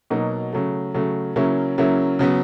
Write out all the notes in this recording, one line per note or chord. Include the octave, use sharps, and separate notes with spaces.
B2 F#3 A#3 D#4
C#3 F#3 A3
C#3 F#3 A3
C#3 F#3 A#3 C#4 E4
C#3 F#3 A#3 C#4 E4
C#3 F#3 B3